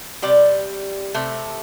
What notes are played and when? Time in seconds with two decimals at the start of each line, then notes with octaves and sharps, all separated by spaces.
0.22 C3 G3 D5
1.14 C3 A3